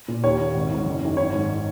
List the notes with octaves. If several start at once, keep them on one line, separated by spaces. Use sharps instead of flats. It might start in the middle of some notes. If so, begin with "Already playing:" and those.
A#2
D#2 C#5
D#3
G#1
G#2 D#3
F#1
F#2 D#3
G#1 C#5
G#2 D#3